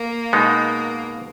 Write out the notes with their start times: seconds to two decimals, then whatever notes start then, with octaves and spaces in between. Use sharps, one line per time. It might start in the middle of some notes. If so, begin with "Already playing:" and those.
Already playing: A#3
0.33 B2 G#3 B3 D#4